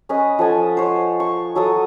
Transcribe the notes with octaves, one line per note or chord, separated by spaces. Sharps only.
C#4 B4 D#5
F3 A4 F#5 G#5
C5 C#5
C#6
F#3 A4 F#5 D#6